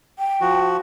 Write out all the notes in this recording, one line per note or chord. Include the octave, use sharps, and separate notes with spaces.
G5
F3 F#4